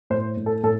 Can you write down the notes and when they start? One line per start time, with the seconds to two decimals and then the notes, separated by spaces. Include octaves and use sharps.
0.10 A2 C5
0.37 A2
0.46 A4
0.63 A2 A4